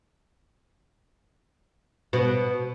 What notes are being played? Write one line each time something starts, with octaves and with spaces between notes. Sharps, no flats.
B2